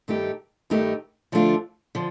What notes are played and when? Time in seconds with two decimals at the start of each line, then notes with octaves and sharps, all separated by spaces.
0.08 G2 D#3 A3 D#4 G4
0.70 G2 D#3 A3 D#4 G4
1.32 D3 F3 A3 D4 F4
1.95 D3 F3